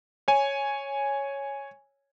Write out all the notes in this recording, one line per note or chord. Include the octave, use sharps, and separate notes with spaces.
C#5 G#5